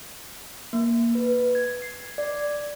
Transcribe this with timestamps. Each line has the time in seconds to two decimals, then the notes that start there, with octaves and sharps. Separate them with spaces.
0.73 A#3
1.15 B4
1.55 G#6
1.82 C7
2.18 D5